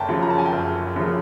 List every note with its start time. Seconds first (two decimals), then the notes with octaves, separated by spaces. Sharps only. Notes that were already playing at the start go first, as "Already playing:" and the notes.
Already playing: F#1 G5 A5 A#5
0.09 F#2 C#3 F3
0.22 A#5
0.30 A5
0.38 G#5
0.46 G5 A5
0.52 F#1
0.96 F#2 C#3 F3